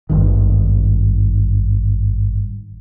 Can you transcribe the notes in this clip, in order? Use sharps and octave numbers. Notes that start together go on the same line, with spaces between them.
G#1 G2 D#3